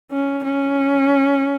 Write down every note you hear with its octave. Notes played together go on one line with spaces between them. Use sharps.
C#4
C#4